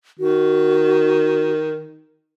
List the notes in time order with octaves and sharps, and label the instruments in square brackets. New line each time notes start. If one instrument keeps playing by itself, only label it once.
[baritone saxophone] D#3 [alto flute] F#4